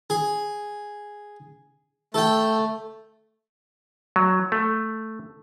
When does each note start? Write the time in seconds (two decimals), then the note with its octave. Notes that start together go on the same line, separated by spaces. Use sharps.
0.10 G#4
2.14 A3 A4 G5
4.16 F#3
4.52 A3